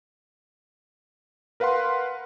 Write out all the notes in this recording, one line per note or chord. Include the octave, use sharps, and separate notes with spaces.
A#4 B4 F5 F#5 C6